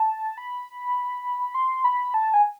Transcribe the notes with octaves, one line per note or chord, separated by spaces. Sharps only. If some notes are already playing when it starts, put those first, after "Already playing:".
Already playing: A5
B5
C6
B5
A5
G#5